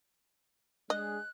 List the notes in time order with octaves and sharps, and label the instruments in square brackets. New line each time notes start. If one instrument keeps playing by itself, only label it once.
[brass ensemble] G#3 D4 G#4 [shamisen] D#5 [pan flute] F#6